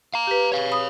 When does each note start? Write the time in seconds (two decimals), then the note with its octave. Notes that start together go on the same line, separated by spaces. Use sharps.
0.14 F5 A#5
0.27 G4 B4
0.52 C#5 F5
0.72 B5 D#6